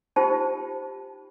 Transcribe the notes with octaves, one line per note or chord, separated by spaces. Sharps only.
D#4 F4 G4 C5 G5 A5